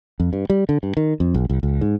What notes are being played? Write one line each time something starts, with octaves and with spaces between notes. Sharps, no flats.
F2
G2
G3
D3
G2
D#3
F2
B1
C2
C#2
G#2